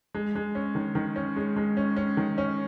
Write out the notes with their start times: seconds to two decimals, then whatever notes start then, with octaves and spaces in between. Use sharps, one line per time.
0.14 G#3
0.35 G#3
0.55 C#4
0.75 D#3
0.95 D#3
1.16 C#4
1.36 G#3
1.56 G#3
1.77 C#4
1.96 C#4
2.17 D#3
2.38 C#4